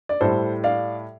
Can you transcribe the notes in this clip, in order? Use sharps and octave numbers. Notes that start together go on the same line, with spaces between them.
D5
A2 G3 A4 C5
D5 F5